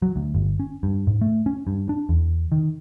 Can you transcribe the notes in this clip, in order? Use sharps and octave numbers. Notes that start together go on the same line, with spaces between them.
F#3
D2
G1
C#4
G2
G#2
A3
C#4
G2
D4
E2
D#3